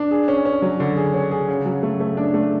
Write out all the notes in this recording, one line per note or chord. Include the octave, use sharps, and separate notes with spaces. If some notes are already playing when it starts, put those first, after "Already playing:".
Already playing: D4
G#4
C#4
C#4
F#3
D3
G#4
C#4
G#4
C#3
F#3
A3
A3
D4
A3